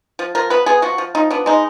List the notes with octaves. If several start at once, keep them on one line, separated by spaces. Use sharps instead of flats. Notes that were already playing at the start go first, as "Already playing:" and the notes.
F3
F3 A#4
B3 B4
B3 G#4
F3 F#4
F3
F3 D#4
B3 D4
G#3 D#4